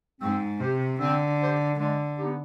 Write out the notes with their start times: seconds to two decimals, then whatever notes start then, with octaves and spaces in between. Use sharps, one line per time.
0.21 G#2 C4
0.60 C3 G4 C5
1.00 D3 C4
1.39 G4 C5
1.78 D3 G#3
2.18 B3 D#4 G4